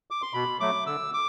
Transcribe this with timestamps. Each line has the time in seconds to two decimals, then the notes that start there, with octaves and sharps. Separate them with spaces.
0.11 D6
0.22 C6
0.33 B2 B5
0.60 F#3 A3 D6
0.86 D3 E6
1.14 D6